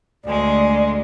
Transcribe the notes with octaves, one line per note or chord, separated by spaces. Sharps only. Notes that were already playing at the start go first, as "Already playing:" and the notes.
D2 G#3 D5